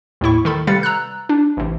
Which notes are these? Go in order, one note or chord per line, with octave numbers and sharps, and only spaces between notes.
D#2 A2 E4 C#6
D#3 A4 B5
C3 G3 B4 F5 A6 C#7
A#5 E6 F#6
D4
A1 C3